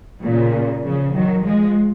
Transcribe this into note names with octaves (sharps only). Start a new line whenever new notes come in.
A#2 C#3
C#3 F3
D#3 F#3
F3 G#3